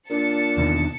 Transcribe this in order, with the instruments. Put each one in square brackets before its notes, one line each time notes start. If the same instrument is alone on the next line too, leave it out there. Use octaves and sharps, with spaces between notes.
[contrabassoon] A#2 [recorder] D4 [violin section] A5 C#7
[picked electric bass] E2 B2 D#3